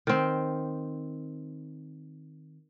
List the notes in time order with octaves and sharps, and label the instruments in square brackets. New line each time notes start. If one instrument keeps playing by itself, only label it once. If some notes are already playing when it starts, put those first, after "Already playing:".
[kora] D#3 C4